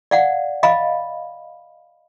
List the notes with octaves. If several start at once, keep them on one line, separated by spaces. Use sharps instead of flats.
D5 F5 F#5
D#5 F5 B5